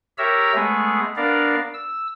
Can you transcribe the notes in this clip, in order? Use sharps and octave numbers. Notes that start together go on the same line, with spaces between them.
G4 A#4 C#5 E5 A#5 E6
G#3 A3 B3 G#4
B3 D4 A#4 D5 F5
E6